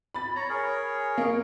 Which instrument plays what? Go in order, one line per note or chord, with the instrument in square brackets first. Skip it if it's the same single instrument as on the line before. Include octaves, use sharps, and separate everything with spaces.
[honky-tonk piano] B5 A6
[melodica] C#5 A#5
G#4 A#4 C#5
[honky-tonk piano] A#3